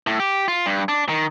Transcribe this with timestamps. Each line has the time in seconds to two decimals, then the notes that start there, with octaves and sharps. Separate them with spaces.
0.07 A2
0.20 G4
0.48 F4
0.66 G2
0.89 D4
1.09 D#3